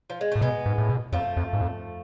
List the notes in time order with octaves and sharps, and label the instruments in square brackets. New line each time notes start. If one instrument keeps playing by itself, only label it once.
[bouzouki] F3
G#3
[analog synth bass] A2 [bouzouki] A3
[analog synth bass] B2 [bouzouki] G#3 B3
[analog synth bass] G#2
A2
B2
[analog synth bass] F2 [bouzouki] F3 A3
[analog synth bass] F2
G#2
F2